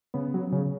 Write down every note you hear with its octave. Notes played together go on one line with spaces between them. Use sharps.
C#3 B3
F#3
C#3